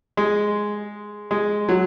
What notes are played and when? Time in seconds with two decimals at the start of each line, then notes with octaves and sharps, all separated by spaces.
0.17 G#3
1.31 G#3
1.69 F#3